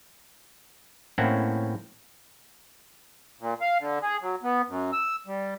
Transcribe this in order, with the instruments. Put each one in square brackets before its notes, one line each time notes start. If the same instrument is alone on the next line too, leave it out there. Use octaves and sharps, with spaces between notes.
[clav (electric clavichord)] A2 A#3 C4 C#4 E4 F#5
[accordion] A#2
F5
D3
G#4
F#3
B3
F#2
E6
G3